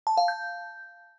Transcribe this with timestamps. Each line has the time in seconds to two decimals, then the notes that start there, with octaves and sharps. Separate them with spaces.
0.07 A5
0.17 F5
0.28 G6